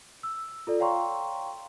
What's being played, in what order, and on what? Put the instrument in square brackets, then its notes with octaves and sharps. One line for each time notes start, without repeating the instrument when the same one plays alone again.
[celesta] E6
F4 A4 D5
C#5 F5 G5 A#5 C6 C#6